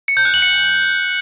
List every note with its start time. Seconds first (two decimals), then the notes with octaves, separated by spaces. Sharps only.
0.08 C#7
0.17 G6
0.25 F#6
0.34 F#7
0.42 C#7